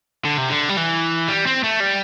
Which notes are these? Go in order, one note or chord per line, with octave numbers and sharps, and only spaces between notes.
D3
C3
D3
G3
E3
G3
C4
A3
G3